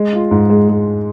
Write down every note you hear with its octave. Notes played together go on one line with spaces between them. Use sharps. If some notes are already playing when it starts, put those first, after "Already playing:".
Already playing: G#3
F4
G#2
G#3
G#3